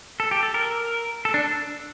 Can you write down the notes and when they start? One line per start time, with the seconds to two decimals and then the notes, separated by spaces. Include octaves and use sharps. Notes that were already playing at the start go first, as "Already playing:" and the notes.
0.20 A4
0.31 G4
0.43 A4
0.54 A#4
1.25 A4
1.34 D4